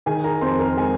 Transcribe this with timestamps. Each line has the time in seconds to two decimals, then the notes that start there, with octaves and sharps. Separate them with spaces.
0.06 D#3 G#4 G#5
0.24 A#4 A#5
0.41 F2 C5 C6
0.59 A#4 A#5
0.77 G#3 G#4 G#5